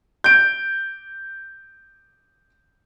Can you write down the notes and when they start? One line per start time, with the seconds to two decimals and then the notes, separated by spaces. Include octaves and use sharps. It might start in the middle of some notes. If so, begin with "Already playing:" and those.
0.24 G6 D7